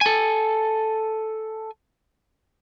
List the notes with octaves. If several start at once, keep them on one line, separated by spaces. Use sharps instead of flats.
A4 G#5